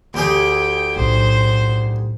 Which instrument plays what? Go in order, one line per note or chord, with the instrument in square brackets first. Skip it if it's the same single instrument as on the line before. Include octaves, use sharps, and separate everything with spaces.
[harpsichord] D2 G4 G#4 [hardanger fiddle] G5
[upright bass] B1 A2 [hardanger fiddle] C5